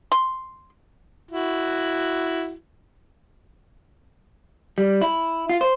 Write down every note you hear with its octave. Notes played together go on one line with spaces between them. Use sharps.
C6
E4 F#4
G3
E4
F4
C5